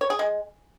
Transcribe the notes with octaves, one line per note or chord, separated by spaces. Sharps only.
C#5
G#4
G#3